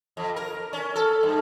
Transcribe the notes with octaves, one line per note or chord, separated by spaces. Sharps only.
F2
A#4
C#4
A4
G2